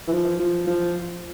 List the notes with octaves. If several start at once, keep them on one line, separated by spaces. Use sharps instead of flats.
E3
F3
F3
F3